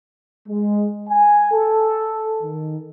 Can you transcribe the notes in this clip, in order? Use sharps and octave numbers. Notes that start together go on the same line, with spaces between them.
G#3
G#5
A4
D#3